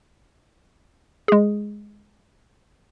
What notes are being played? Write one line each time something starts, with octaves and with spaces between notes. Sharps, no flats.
G#3 G#4